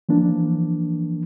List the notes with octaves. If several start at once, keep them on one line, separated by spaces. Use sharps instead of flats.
E3 F3 A#3 D4